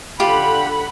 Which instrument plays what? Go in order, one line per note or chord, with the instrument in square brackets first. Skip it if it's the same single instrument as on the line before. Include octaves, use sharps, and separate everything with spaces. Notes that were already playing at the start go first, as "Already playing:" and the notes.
[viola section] D3 F#5 B5 [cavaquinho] F4 G4